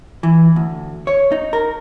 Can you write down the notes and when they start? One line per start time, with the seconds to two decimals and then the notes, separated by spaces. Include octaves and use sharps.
0.23 E3
0.56 D2
1.07 C#5
1.32 D#4
1.53 A#4